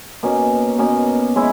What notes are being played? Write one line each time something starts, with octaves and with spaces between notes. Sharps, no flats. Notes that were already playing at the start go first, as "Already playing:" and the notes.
B2 A#3 C#4
B2 A#3 C#4
G#3 C#4 E4